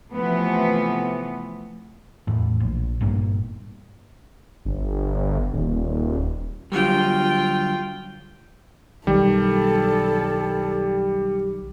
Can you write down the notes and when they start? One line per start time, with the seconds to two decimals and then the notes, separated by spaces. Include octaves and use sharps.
0.11 C3 E3 F3 A3 B3
2.27 E2 A2
2.60 A#1
3.01 G1 G2 A#2
4.65 G1
5.53 D#1
6.72 D3 F#3 G3 F4 G5
9.07 B1 D#3 G3 G4 A4